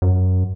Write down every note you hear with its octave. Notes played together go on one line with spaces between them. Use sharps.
F#2